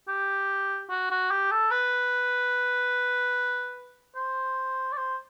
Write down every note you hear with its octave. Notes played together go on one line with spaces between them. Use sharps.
G4
F#4
F#4
G4
A4
B4
C5
D5
C5